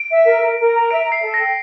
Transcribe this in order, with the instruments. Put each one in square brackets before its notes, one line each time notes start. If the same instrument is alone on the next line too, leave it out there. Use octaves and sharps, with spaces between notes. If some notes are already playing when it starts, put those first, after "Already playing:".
Already playing: [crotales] D7
[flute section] E5
A#4
A#4
A#4
A#5
[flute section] E5 [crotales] D7
[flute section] E5
[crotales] C7
[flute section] A4
[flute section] G5 [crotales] A#6